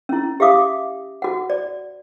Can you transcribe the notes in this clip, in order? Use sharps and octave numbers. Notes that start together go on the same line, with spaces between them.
C#4 E4
G4 E5 F5 D6 D#6
F#4 F#5
D5